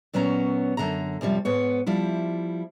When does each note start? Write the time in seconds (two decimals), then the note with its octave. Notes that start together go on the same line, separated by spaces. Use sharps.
0.13 A#2 F#3 B3 C#4 A#5
0.77 F#2 D3 A#5
1.21 F#2 C3 F3 G3
1.45 G#2 B3 C#5
1.86 F3 G3 E4